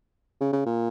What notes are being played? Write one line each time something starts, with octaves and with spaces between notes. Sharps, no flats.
C#3
C#3
A#2